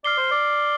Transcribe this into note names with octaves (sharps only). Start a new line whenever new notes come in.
D5 F6 C7 G7
C5
D5